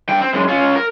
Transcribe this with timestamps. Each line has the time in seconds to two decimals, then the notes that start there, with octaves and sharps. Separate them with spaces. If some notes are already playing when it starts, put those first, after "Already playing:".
0.09 G2 G5
0.22 C4
0.34 F#2 G#3
0.49 C#4 F4
0.76 A#4